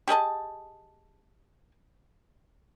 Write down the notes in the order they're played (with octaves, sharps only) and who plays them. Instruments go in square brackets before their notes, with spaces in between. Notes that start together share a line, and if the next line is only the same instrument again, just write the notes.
[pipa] G4 G#4 D#5 A5